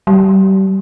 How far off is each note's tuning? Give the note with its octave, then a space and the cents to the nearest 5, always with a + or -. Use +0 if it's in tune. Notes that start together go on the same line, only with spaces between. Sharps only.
G3 -30